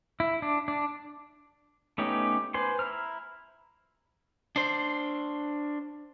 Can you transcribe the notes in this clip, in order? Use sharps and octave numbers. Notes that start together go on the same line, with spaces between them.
E4
D4
D4
A3 B3 C#4 D#4 G4
B4 C5 G#5 C6
E4 A#5 F6
D4 C5